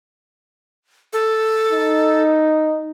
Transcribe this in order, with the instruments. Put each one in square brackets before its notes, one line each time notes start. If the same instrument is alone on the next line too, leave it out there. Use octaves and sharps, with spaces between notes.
[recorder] A4
[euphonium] D#4